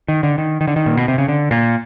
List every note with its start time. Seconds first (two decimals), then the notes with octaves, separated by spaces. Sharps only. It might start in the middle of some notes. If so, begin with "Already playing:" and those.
0.08 D#3
0.23 D3
0.38 D#3
0.61 D#3
0.68 D3
0.76 D#3
0.86 A#2
0.97 B2
1.08 C3
1.18 C#3
1.28 D3
1.51 A#2